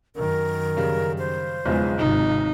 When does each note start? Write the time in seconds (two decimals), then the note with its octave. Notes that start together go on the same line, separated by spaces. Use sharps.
0.16 F#2 D#3 A#4
0.77 C#3 G3
1.19 C5
1.66 B1 E2 C#3 F3 G#3
1.99 G#1 C3 D#4